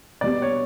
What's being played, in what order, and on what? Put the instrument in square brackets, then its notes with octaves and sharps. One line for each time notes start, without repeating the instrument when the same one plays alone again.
[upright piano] B2 G3 B3 [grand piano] D5
[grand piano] C#5